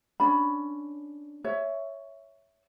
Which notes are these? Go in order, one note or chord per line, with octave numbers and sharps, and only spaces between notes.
C#4 D4 B5
C#5 E5